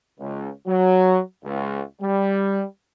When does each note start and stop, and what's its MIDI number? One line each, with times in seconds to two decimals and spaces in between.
0.20 0.49 37
0.67 1.20 54
1.44 1.82 37
2.01 2.64 55